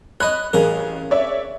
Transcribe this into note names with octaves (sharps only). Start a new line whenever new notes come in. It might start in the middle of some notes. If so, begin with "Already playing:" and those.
C#5 D#5 B5 F#6
A1 C#3 A#4
C#5 D5 E5